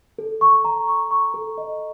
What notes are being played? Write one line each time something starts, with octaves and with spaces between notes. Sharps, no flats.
A4
C#6
A#5
C#6
C#6
A4
D#5